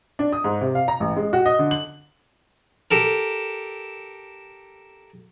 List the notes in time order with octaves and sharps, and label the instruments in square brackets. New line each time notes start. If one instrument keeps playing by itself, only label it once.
[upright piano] D4
D#6
G#2
C3
F5
A#5
A1
G#3
F#4
D#5
D3
F#7
[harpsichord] G4 A4 A#4